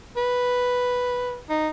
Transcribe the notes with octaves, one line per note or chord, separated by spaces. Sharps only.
B4
D#4